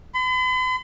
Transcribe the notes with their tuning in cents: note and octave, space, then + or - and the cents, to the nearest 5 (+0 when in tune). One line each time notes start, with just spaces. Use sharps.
B5 +45